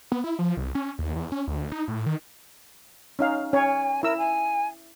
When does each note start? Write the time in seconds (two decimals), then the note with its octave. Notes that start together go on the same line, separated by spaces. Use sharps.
0.12 B3
0.24 E4
0.39 F3
0.57 C2
0.75 C#4
0.99 D#2
1.16 E2
1.32 C#4
1.47 D2
1.72 D#4
1.88 A2
2.06 D#3
3.19 C#4 D#4 F5
3.53 C#4 C#5 G#5
4.03 E4 A#4 E6
4.18 G#5